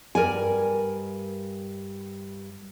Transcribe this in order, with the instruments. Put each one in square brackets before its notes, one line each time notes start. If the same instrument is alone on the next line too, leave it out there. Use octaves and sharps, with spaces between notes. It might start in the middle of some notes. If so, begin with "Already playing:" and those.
[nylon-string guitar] G2 A#4 D5 G#5